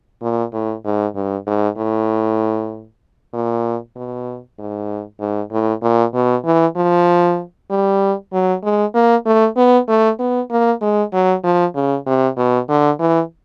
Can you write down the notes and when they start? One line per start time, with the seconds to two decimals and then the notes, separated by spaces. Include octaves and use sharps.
0.22 A#2
0.53 A2
0.85 G#2
1.15 G2
1.47 G#2
1.77 A2
3.33 A#2
3.96 B2
4.59 G#2
5.20 G#2
5.51 A2
5.82 A#2
6.14 B2
6.45 E3
6.76 F3
7.70 G3
8.33 F#3
8.63 G#3
8.94 A#3
9.26 A3
9.57 B3
9.88 A3
10.19 B3
10.51 A#3
10.81 G#3
11.13 F#3
11.44 F3
11.75 C#3
12.06 C3
12.37 B2
12.69 D3
12.99 E3